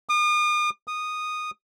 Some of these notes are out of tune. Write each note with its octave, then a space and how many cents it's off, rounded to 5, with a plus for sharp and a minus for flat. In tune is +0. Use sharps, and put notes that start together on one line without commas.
D#6 -40
D#6 -10